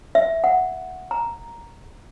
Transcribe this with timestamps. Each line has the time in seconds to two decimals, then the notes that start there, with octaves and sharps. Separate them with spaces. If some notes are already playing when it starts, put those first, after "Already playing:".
0.15 E5
0.44 F#5
1.11 A#5